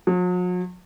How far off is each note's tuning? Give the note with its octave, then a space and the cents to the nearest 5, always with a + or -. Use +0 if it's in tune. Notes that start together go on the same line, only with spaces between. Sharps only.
F#3 -45